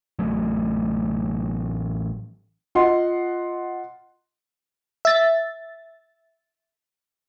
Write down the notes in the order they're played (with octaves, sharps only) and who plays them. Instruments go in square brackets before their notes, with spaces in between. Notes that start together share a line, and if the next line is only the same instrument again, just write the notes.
[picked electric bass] A1 F#3 A3
[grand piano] F4 D#5 F#5 C6
[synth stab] E5 A6